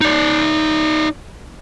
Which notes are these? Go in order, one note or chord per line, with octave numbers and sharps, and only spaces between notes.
D#4 D5